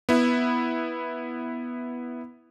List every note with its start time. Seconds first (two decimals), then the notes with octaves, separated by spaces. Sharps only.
0.09 B3 E4